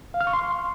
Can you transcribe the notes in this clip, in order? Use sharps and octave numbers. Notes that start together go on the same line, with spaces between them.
F5
F6
C#6
C6